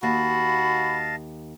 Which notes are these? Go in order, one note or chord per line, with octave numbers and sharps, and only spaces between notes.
D#2 F#4 D#5 F5 A5 B5